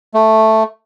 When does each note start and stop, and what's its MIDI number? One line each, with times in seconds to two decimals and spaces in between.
0.14 0.63 57